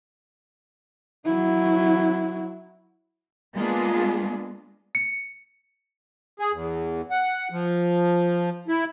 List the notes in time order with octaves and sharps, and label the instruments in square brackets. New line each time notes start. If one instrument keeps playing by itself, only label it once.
[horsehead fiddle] F#3 E4
[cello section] G#3 A#3 B3 D4 F4 G#4
[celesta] C#7
[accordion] G#4
E2
F#5
F3
E4